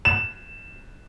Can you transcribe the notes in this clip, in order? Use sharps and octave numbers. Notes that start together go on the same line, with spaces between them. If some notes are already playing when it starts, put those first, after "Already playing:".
E7